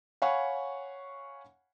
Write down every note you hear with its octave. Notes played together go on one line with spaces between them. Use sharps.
C#5 F5 F#5 G#5 B5 C#6